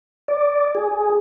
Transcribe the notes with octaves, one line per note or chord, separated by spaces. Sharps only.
D5
G#4